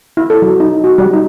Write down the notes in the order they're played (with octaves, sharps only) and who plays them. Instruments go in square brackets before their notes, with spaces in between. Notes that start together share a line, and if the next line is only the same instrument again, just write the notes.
[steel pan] E4
A4
F#3
D#4
F#4
G3
D#4